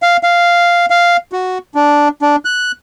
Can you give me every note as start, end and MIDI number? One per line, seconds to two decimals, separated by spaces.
0.02 0.17 77
0.23 0.86 77
0.90 1.17 77
1.32 1.58 66
1.75 2.08 62
2.22 2.36 62
2.45 2.72 90